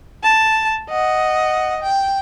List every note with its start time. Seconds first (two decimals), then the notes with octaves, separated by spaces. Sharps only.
0.24 A5
0.90 D#5 F#5
1.82 G5